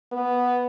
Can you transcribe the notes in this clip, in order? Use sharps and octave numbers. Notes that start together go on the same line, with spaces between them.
B3